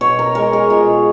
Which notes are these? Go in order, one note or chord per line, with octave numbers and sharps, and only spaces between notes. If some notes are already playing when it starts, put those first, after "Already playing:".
B2 C#5
A#4
G#3 A#4
G#4
B2 F4